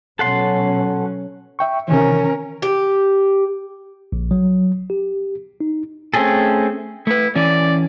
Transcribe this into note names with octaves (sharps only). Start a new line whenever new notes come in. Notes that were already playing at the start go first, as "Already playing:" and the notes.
B2 F#3 C#4 A4 F#5 C6
E5 G5 C#6
C3 D#3 E3 C#4 A#4
G4
A#1
F#3
G4
D#4
A3 C4 C#4 G#4 A4
A3 E4 B4
E3 C#4 D5